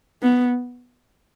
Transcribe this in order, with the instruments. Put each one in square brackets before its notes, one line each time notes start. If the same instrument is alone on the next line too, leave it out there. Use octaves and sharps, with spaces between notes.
[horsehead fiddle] B3